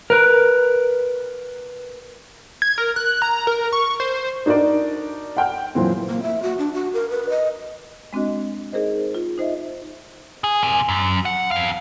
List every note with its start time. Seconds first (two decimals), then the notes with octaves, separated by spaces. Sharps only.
0.10 A#4 B4
2.62 G#6
2.78 A#4
2.96 F#6
3.22 A#5
3.47 A#4
3.73 C#6
4.00 C5
4.46 D4 D#4 F#4 A#4 D5
5.37 F#5 G5 F6
5.75 F#2 A#2 E3 C4
6.08 A#3
6.23 E5
6.42 F#4
6.58 D4
6.73 F#4
6.93 A#4
7.10 B4
7.29 D#5
8.13 G#3 C4 D4 F#4 D#5
8.72 D#4 G#4 A#4 C5 D#5
9.15 F4
9.38 D#4 C5 D#5 E5
10.44 G#4
10.63 C3 G#5
10.89 F#2
11.25 F#5
11.51 F2 F5